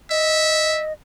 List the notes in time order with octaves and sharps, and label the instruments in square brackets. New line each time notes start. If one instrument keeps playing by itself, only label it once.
[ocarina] D#5 [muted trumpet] E5